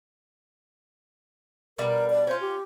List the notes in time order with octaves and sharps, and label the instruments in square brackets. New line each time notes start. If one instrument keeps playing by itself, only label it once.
[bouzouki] B2 G3 D4 [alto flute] A#4
[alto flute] D5
[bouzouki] C#4 F4 [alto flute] C5
[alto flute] G4